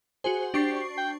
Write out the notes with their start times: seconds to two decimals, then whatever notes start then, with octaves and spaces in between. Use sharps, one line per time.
0.24 F#4 G#4 C5
0.54 D4 G4 C#6 C7
0.98 G5